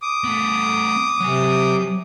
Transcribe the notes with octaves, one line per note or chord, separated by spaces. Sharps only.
D6 D#6
A3 B3
C3 F#3 G#5